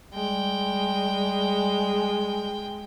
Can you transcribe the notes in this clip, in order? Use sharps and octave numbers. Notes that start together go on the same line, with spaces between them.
G3 G#3 G5